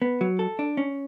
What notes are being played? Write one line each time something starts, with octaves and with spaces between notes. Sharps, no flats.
B3
F#3
A4
D4
C#4